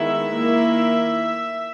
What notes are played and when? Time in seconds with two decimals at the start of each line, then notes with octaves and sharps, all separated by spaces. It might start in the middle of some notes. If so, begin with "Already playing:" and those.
Already playing: D#3 G#3 B3 E4 E5
0.34 D#3 A#3 E4